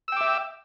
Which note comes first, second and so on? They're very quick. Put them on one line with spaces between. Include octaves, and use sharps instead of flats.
E6 G5 D6 E5